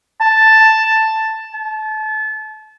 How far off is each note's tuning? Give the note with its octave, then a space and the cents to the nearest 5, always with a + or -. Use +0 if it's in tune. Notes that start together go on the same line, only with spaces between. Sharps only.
A5 +5
A5 -30